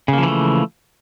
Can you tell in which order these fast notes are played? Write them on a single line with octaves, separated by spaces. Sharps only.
C#3 A#3 F3 E3 A3